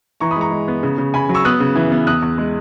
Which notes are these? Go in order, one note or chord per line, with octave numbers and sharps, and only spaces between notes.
E3 A#5 C#6
B5 D#6
G#3
A#5 C#6
G#3
B3
C#3
C#3
C#3 G#5 B5
F#3
C#6 E6
B3 D#6 F#6
C#3
E3
B3
E2 D#6 F#6
E2
G#3